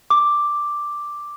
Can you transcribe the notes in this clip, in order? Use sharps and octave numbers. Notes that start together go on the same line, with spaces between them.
D6